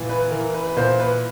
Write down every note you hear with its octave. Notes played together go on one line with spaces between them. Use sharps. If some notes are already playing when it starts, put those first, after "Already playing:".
Already playing: A#2 E3
B4
E3 A#4
B4
B4
A#2 C5
B4